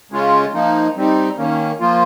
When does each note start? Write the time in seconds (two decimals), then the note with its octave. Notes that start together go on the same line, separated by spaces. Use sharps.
0.12 C#3 G#3 C#4 F4
0.54 F3 A#3 D#4
0.96 G3 C4 D#4
1.38 D#3 A#3 C#4
1.80 F3 A#3 F4